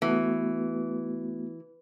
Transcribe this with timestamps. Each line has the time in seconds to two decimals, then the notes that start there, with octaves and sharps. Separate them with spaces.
0.02 E3 A3 B3 F#4